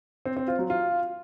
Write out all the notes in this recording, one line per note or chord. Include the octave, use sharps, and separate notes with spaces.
C4
C4
F4
F#3
F4